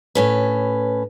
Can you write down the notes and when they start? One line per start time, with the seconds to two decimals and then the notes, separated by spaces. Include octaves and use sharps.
0.15 A2 C#4 B4